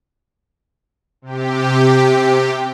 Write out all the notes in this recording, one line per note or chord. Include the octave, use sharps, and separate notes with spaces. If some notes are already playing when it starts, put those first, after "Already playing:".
C3 G4